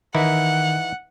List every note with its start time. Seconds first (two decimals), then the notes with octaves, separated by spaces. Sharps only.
0.15 D#3 E3 D#4 E4 F#5